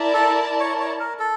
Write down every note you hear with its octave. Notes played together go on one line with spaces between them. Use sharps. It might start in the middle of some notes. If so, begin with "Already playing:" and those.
Already playing: E4 A#4 D5 A5
A4
C#5
C#5
A#4
A4